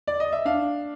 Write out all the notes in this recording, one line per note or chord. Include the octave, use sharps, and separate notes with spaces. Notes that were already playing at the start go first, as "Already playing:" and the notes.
D5
D#5
E5
D4 F5